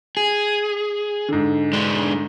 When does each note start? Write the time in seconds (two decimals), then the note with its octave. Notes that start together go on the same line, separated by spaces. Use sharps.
0.17 G#4
1.28 G#2 D3
1.73 G#3 D4